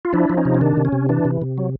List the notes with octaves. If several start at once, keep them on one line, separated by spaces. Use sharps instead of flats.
F4
F3 D4 E4
F3
C#4 D#4
C3
C#4
D#3 D4
C3
C#4
C3
E3 D4
C3
C3
F#3